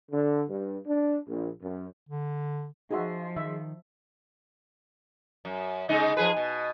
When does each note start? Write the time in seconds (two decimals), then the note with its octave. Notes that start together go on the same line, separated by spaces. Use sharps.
0.11 D3
0.48 G2
0.86 D4
1.27 A#1
1.61 F#2
2.09 D3
2.91 F3 D#4 F#4 G#4 D#5 E5 C6
3.36 D#3 E5
5.45 F#2
5.89 C#3 G#3 D#4
6.17 F3 G#4 B4
6.37 B2